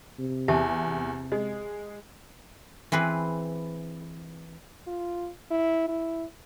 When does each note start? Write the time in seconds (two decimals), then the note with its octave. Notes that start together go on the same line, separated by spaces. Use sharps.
0.19 C3
0.48 E2 G4 E5 A5
0.84 C3
1.32 G#3 D#5
2.92 E3 C4 G#4 B4
4.87 F4
5.51 E4
5.88 E4